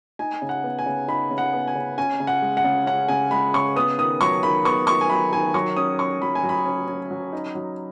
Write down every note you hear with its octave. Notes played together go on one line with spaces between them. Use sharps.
D#4 G#5
C#3
F#5
B3
G#5
C#3
D#4 B5
C#3
F#5
B3
G#5
C#3
C#4 G#5
C#3
F#5
G#3
F#5
C#3
C#4 F#5
C#3 G#5
G#3 B5
C#3 C#6
B3 D#6
D#3 D#6
F#3 C#6
D#3 B5
B3 C#6
D#3 C#6
G#5
F#3 B5
D#3 G#5
F#3 C#6
C#4 D#6
C#4 C#6
F#3 B5
G#5
F#3
B5
C#4
C#4
F#3
D#4
F#3